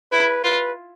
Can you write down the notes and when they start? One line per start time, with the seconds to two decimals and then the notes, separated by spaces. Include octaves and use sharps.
0.12 E4 B4
0.44 F4 B4